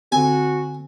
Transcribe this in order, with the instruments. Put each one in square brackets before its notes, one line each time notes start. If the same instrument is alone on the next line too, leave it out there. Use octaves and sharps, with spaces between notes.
[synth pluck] D3 C4 [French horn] F#4 [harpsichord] G#5